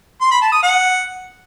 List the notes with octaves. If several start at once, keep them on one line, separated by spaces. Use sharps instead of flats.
C6
B5
A5
D#6
F#5